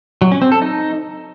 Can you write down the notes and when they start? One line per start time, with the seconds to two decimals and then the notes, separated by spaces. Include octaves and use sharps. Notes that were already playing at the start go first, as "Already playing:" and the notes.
0.22 F#3
0.32 C#4
0.42 C4
0.52 A4
0.62 D#4